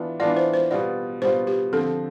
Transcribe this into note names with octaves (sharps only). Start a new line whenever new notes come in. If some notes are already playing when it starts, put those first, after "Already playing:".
Already playing: E3 B3 D4 F4
E3 B3 D4 F4 D5
C5
C5
B2 G3 B3 F4 D5
B2 G3 B3 F4 C5
G4
D3 F3 C4 A4